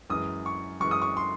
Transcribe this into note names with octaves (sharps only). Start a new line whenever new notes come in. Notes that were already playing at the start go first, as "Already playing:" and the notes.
F#2 E3 G#3 D#6
C#6
F#2 E3 G#3 C#6
D#6
C#6
C6